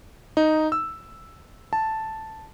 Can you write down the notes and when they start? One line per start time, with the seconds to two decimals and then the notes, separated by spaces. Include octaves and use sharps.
0.37 D#4
0.72 E6
1.73 A5